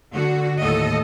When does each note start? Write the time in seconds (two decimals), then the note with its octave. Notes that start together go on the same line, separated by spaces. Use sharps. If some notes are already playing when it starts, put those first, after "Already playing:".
0.13 D3 F#4
0.60 D#2 A2 A4 D#5